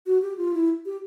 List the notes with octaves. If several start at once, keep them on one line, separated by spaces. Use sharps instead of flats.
F#4
G4
F4
E4
G4